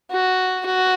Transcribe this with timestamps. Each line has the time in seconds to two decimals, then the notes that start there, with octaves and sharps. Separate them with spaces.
0.11 F#4
0.66 F#4